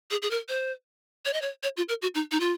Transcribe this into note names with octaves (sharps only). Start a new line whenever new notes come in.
G#4
G#4
A#4
C5
C#5
D#5
C#5
C#5
F4
A#4
F#4
D#4
D#4
F4